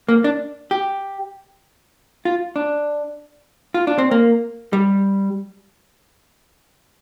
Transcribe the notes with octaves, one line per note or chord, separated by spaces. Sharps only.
A#3
D4
G4
F4
D4
F4
D4
C4
A#3
G3